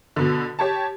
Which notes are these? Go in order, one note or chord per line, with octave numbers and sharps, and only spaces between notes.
B2 D3
G4 C#5 A5